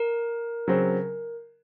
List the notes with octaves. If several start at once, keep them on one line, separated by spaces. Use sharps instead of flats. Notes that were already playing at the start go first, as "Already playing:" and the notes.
Already playing: A#4
C#3 F#3 C4